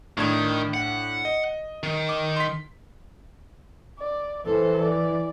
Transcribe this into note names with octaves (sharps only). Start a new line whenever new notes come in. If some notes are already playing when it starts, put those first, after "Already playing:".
A2 D#3 D4 G#6
F#5
D#5
D#3
D6
C6 B6
D5
E3 A4 C5
D5